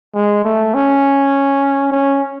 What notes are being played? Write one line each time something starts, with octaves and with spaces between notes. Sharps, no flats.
G#3
A3
C#4
C#4